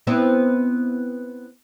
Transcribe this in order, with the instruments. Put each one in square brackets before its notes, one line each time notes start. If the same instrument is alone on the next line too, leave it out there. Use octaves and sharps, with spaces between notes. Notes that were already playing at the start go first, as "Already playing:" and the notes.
[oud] B3 C4 E4